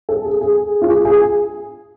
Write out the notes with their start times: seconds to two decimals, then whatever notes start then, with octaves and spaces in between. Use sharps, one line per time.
0.09 A4
0.25 G#4
0.41 G#4
0.82 F4
0.89 G#4
1.05 G#4